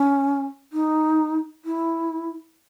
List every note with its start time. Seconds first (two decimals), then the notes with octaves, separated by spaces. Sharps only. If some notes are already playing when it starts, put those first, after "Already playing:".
Already playing: C#4
0.73 D#4
1.65 E4